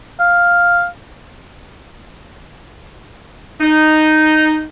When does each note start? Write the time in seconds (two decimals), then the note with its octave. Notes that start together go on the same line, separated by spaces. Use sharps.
0.20 F5
3.61 D#4